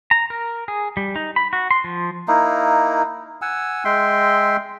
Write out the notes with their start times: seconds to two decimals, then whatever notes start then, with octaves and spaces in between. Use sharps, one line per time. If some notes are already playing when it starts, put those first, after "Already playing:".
0.11 A#5
0.30 A#4
0.68 G#4
0.97 G3
1.16 D#4
1.36 B5
1.53 F#4
1.71 C6
1.84 F3
2.28 A#3 D#4 E4
3.42 F#5 G#5 E6
3.85 G#3 E5 G5 C6